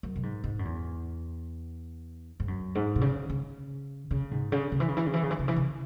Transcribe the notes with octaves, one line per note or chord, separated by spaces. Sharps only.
F#2
B2
G#2
G#2
F#2
E2
G#2
F#2
G#2
B2
C#3
C#3
C#3
G#2
C#3
C#3
E3
C#3
E3
C#3
E3
C#3
E3
C#3
E3
C#3